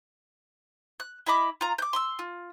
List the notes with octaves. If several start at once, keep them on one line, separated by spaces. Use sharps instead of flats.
F#6
E4 D#5 B5 D6
F4 A#5
D6 G6
C6 D6 E6
F4